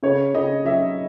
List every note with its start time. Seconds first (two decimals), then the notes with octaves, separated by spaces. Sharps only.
0.03 C#3 C#5
0.34 C#3 D#5
0.65 F#3 E5